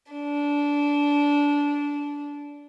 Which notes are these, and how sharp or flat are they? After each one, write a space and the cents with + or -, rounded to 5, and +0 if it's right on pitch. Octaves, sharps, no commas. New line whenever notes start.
D4 -20